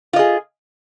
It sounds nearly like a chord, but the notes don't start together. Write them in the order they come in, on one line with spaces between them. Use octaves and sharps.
F4 D#5 G#4